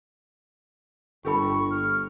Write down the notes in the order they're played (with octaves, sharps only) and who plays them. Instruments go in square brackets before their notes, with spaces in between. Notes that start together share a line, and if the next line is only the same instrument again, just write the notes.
[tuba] G1 [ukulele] G4 A4 B5 [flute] C#6
[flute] F6